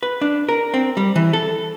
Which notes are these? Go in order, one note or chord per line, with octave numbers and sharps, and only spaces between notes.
B4
D4
A#4
C4
G3
E3
A4